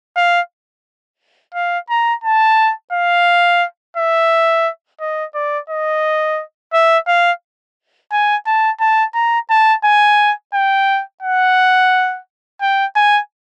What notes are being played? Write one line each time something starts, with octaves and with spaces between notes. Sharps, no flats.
F5
F5
A#5
A5
F5
E5
D#5
D5
D#5
E5
F5
G#5
A5
A5
A#5
A5
G#5
G5
F#5
G5
G#5